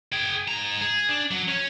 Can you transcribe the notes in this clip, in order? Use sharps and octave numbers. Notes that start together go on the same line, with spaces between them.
G#4 G5
G#2 A#5
G#4
D4
F#3
C#4